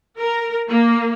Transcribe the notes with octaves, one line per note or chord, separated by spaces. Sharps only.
A#4
A#3